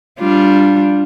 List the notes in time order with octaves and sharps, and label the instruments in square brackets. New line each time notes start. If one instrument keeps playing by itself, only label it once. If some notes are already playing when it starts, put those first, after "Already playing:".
[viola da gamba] G3 D4 F4